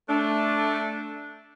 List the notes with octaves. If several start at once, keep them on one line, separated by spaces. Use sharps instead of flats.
A3 D4